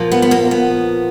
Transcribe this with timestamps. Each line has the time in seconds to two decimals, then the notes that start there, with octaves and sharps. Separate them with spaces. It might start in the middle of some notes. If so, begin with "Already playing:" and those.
Already playing: A#2 F3 A#3
0.11 B3
0.22 B3
0.31 A#3
0.51 B3